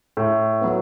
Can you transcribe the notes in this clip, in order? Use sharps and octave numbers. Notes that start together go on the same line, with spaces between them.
A2
F#3 B3